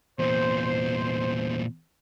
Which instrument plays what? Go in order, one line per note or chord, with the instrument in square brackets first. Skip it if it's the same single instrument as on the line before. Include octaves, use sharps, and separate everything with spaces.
[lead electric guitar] E2 A#2 [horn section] C5